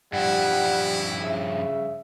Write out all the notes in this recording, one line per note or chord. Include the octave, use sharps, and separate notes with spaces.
G2 F3 G3 E4 F#5
C#3 E5